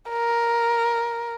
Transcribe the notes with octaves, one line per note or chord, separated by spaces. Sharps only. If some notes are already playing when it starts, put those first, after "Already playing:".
A#4